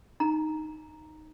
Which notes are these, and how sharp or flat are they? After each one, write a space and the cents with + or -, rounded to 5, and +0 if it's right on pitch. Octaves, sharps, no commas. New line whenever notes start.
D#4 -5 A#5 +0